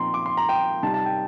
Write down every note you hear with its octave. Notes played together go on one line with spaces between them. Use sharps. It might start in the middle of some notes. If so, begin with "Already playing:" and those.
Already playing: A#2 F3 C4 D#4 A#5 C6
D6
C6
A#5
G5
C3 G3 C4 D#4 A5
A5
G5